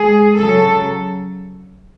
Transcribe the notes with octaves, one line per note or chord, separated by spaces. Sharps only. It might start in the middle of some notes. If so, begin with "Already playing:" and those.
Already playing: G#3 G#4
C#3 F#3 A4